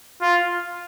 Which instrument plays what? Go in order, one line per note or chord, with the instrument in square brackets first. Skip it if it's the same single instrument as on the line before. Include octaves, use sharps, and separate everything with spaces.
[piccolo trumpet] F4